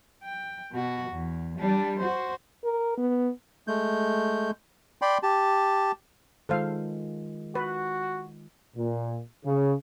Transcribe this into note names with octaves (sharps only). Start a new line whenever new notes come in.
G5
B2 F#4
E2
G3 D4
F#4 C5
A#4
B3
G#3 A3 G6
D5 G5 B5 C6
G4 A5
D#3 G#3 F4 A4 C5 F5
F#4 B4
A#2
C#3